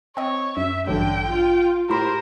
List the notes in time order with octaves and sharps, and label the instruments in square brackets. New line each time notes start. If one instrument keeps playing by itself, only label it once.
[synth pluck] C4 D#5 [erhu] C#5
[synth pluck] F#2 [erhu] E5
[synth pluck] A1 G2 F#3 [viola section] D3 [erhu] G5
[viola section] F4
[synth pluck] A2 B5 [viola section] G4 C5 [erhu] A#4